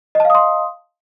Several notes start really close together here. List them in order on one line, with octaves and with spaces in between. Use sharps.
D#5 A5 F5 D#6 C6